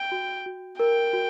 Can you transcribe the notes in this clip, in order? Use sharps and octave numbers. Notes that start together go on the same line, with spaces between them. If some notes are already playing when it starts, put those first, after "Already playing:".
Already playing: G5
F#4
F#4
A#4 G5
F#4